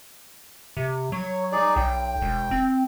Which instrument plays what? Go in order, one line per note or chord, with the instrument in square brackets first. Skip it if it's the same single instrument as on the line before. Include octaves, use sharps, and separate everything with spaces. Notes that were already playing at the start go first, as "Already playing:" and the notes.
[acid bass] C3
[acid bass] F#3 [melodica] C#5
[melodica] D#4 G#4 D5
[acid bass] B1 [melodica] G5
[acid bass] E1
C4